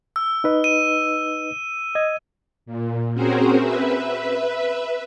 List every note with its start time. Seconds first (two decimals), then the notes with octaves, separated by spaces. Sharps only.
0.16 E6
0.44 D#4 B4 D#5
0.64 D#7
1.95 D#5 G#6
2.66 A#2
3.14 C4 C#4 F#4 G#4 A#4 C5
3.58 B4 E5